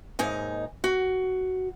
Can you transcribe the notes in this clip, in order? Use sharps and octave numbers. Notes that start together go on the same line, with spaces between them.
D#2 G#2 D#4 G#5
F#4